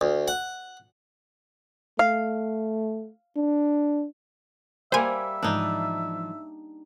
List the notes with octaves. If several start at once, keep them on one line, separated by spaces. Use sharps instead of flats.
D2
F#5
A3 F5
D4
G3 A#3 G4 C5 E5 G#5
G#2 E3 F3 D4 D#4